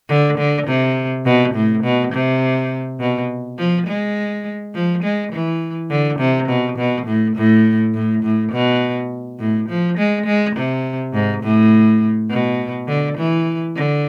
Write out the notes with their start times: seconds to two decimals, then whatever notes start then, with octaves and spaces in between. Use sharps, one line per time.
0.09 D3
0.38 D3
0.67 C3
1.25 B2
1.54 A2
1.83 B2
2.13 C3
3.00 B2
3.58 F3
3.87 G#3
4.74 F3
5.03 G#3
5.32 E3
5.90 D3
6.19 C3
6.48 B2
6.77 B2
7.07 A2
7.36 A2
7.94 A2
8.23 A2
8.52 B2
9.39 A2
9.69 F3
9.98 G#3
10.26 G#3
10.56 C3
11.13 G#2
11.43 A2
12.30 B2
12.88 D3
13.17 E3
13.76 D3